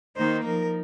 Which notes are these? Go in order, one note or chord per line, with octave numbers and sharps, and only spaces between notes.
D#3 A#3 D#4 C5
F3 D#4 A#4